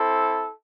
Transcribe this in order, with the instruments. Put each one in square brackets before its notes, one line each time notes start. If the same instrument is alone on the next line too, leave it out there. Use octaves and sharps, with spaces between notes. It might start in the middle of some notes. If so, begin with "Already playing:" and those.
Already playing: [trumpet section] C4 E4 A4